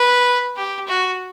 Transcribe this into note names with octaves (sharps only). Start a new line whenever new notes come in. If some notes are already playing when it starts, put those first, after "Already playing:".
Already playing: B4
G4
F#4